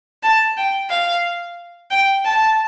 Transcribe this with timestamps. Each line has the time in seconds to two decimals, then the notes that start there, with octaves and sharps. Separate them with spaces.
0.23 A5
0.57 G5
0.90 F5
1.91 G5
2.25 A5